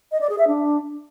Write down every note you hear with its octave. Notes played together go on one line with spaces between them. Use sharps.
D#5
D5
G#4
E5
D4